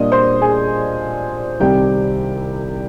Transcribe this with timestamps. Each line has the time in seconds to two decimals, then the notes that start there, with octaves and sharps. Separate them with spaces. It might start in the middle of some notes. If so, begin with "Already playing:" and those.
Already playing: A#2 G3 D4 D#5 D#6
0.12 C5 C6
0.41 G#4 G#5
1.60 C2 C3 D#3 G3 C4 G4 G5